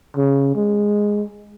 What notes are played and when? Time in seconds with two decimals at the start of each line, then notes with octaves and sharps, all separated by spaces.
0.17 C#3
0.56 G#3